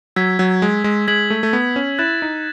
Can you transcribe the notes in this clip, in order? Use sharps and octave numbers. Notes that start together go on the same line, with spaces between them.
F#3 E6 G#6 B6
F#3
G#3
G#3
G#3 G#6 B6 F#7
A3
A3
B3
C#4
E4 F#6 A6 E7
D#4